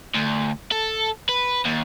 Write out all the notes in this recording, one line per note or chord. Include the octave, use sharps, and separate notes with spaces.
D2
A4
B4
D#2